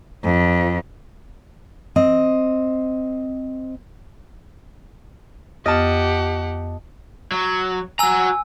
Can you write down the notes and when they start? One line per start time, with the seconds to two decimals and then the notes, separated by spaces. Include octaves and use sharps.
0.24 F2
1.96 C4 D#5
5.66 F2 B3 G4 D#5 F#5 A5 F6
7.31 F#3
7.99 F#4 G#5 A#5 E6